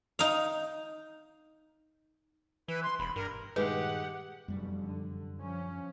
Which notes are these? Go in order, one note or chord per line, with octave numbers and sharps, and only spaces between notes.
D#4 F5
E3 B4
C6
E1 B5
G2 A#4
G2 A#2 D#3 G#3 G4 B4 F#5
F1 F#2 B2 G3
D3
F3 C#4